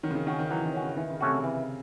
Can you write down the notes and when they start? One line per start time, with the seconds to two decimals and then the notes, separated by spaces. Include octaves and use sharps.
0.03 D#3 F#3
0.11 C#3
0.15 D#3
0.27 D#3 C#4 F#4
0.39 D#3
0.50 E3 F#3
0.66 D#3
0.74 C#4 F#4
0.82 C#3
0.97 D#3 E3
1.10 C#3
1.21 C3 A3 C#4 F#4
1.35 C#3
1.44 E3